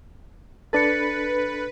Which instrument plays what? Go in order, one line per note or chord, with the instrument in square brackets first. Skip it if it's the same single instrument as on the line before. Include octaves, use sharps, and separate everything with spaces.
[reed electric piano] D4 A4 [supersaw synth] B4 [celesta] A6 C#7